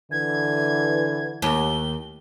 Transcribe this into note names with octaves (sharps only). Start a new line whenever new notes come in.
D3 E3 G#6
D#2 G7